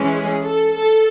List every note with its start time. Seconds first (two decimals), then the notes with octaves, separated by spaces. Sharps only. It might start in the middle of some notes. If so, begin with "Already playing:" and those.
Already playing: E3 G#3 C#4
0.16 G#4
0.44 A4
0.74 A4